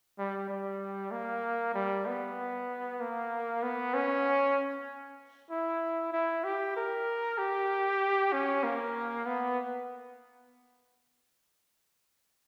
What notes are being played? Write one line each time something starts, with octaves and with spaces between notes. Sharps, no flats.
G3
G3
A#3
G3
B3
A#3
B3
C#4
E4
E4
G4
A#4
G4
C#4
A#3
B3